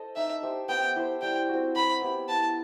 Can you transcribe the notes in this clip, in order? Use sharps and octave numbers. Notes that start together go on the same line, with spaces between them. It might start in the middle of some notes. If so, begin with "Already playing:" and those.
Already playing: A4 C5 D#5
D#4 E5
G4 C5 E5
B3 G5
E4 G4 C5
G3 G5
C4 F#4
F#3 B5
B3 E4 G4
B3 A5